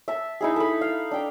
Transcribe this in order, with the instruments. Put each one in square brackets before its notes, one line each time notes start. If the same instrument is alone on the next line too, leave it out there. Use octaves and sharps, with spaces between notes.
[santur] E5 A5
D#4 E4 G#4
A4 B5
F5
D4 G5